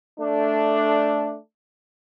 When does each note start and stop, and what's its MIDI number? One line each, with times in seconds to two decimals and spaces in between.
0.20 1.37 57
0.20 1.37 62